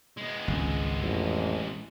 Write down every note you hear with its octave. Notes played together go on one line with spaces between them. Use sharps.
G#3 B3
G#1 C#2
A1 F2